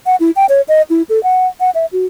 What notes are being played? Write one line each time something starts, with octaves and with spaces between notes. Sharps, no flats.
F#5
E4
G5
C#5
D#5
E4
A4
F#5
F#5
E5
F#4